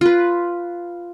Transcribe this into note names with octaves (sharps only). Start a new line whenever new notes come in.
F4 B4